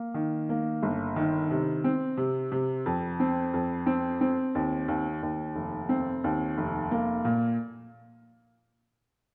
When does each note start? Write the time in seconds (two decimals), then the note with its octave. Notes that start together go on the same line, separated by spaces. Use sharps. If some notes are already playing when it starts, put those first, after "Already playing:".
Already playing: A#3
0.14 D#3
0.49 A#3
0.82 G1
1.16 D#3
1.50 C3
1.84 C4
2.17 C3
2.52 C3
2.86 F2
3.20 C4
3.54 F2
3.86 C4
4.21 C4
4.55 D#2
4.88 D#2
5.23 D#2
5.55 F1
5.89 C4
6.24 D#2
6.57 F1
6.91 A#3
7.25 A#2